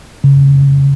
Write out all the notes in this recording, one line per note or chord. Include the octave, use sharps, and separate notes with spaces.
C#3